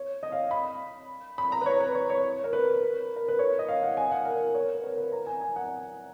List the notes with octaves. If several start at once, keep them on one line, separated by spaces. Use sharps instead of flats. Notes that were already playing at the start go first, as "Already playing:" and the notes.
Already playing: C#5
D#5
F5
B5
B5
A#5
B4
C#5
B4
C#5
C#5
A#4
B4
A#4
B4
C#5
D#5
F5
F#5
G#5
F5
F#5
A#4
A#4
C#5
B4
A#4
B4
A#5
G#5
G#5
F#5